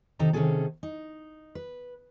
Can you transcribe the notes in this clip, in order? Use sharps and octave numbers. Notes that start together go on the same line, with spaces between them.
C3 D#3 D#4 A4 A#5
C3 D#3 E3 C#4 G#4 A4
D#4
B4